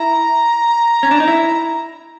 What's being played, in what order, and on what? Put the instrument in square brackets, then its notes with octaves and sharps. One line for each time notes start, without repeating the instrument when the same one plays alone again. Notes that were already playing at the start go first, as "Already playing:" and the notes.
Already playing: [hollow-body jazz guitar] E4 [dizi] A#5
[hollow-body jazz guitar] C#4
D4
D#4
E4